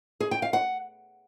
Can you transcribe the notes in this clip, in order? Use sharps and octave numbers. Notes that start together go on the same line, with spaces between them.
G#4
G5
F5
F#5